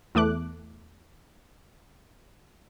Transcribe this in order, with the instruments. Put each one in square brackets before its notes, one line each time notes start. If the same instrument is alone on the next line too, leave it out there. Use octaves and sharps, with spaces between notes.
[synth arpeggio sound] E2 A3 D6 F#6